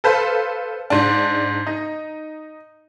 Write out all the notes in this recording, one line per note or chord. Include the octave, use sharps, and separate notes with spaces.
A4 B4 C5 F5
G#2 D4
D#4